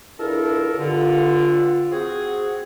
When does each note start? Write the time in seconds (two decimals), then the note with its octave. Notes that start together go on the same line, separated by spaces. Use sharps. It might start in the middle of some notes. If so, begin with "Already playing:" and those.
0.20 C#2 D4 E4 A4 A#4
0.78 G2 D3 F4
1.92 C4 F#4 G#4